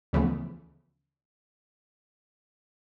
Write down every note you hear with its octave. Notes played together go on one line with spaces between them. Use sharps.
D2 C#3 E3 F3 A3 B3